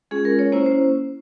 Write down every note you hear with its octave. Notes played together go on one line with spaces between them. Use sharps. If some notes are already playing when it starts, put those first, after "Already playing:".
G#3 C#4 F4 G#4
A#4
C#5
A#3 C#4 E4 C5
C5